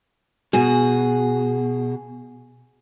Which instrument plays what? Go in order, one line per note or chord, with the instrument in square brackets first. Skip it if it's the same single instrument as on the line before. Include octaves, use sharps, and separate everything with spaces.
[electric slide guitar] B2 [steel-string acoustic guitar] F#4 G#4